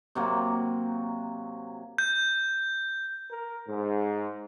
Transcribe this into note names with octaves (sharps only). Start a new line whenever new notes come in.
C3 F#3 A#3
G6
A#4
G#2